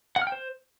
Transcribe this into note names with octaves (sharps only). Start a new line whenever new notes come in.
F#5
F6
G5
C5